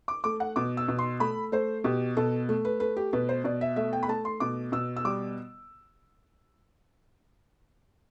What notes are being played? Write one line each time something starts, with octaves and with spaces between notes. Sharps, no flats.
D6
A3 D6
F#5
B2 D6
E6
B2
C6
A3 B5
A3 C5
B2 G4
B2 A4
A3
B4
A3 B4
G4
B2 B4
C5
B2 D5
E5
A3 E5
G5
B5
A3 A5
C6
B2 D6
B2 E6
E6
G3 D6